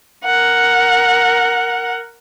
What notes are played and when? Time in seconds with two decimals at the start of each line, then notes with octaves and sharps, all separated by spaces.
0.24 A#4 F#5